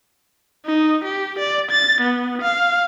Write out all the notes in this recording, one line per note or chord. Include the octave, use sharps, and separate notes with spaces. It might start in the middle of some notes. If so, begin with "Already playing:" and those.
D#4
G4
D5
A6
B3
F5